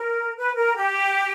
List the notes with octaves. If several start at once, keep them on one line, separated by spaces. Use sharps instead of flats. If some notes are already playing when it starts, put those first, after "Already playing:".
Already playing: A#4
B4
A#4
G4